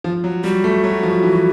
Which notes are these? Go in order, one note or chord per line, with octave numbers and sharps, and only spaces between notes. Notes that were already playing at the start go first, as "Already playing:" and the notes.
F3
F#3
G3 F#4
A3
F#3
F3
E3